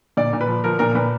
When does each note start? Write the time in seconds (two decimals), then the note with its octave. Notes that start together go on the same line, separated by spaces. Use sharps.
0.17 A#2 D5
0.33 A#2
0.41 B4
0.48 F3
0.64 F3 A#4
0.79 A#2 A#4
0.95 A#2 B4